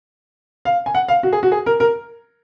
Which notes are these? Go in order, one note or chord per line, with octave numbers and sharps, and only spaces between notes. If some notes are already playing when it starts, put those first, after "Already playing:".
F5
G#5
F#5
F5
F#4
G#4
F#4
G#4
A#4
A#4